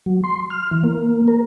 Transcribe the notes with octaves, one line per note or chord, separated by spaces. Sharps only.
F#3
C6
F6
E3
A#3
A#4